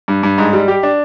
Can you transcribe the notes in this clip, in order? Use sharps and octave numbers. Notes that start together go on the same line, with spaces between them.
G2
G2
G#2
G3
G4
D4